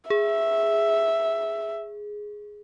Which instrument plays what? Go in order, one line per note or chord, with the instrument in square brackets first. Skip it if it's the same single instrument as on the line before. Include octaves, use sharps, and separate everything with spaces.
[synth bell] G#4 [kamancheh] E5